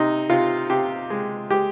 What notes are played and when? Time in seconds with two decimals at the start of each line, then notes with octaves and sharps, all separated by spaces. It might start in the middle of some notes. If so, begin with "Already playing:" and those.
Already playing: C3 D#4
0.29 C3 F4
0.69 C3 G4
1.10 G#3
1.50 G#3 G4